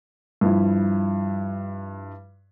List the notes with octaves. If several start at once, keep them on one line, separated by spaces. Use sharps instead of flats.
G2 F3 E4